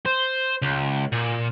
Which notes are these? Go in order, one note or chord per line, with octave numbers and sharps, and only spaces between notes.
C5
C#2
A#2